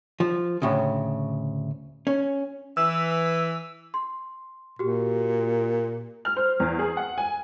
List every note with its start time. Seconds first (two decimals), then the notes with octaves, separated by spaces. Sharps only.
0.20 F3
0.62 D2 A2 C#3
2.07 C#4
2.77 E3 E6
3.94 C6
4.79 A#2 F#4 G4
6.25 F6
6.37 C5
6.60 E2
6.79 G#4
6.97 F#5
7.18 G#5